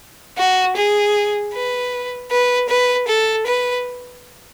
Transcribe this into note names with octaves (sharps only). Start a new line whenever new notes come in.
F#4
G#4
B4
B4
B4
A4
B4